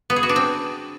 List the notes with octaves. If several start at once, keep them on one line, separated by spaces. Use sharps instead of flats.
B3
G#4
F#4
D4
C4